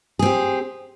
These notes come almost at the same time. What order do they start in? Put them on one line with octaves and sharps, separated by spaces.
G#4 C4 G4